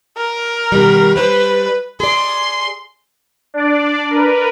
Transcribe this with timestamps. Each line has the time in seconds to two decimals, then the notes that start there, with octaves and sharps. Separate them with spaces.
0.17 A#4
0.72 B2 D#3 G3
1.16 G3 B4 C5 D5
2.00 G#4 D5 C6
3.54 D4 D5
4.11 A#4 B4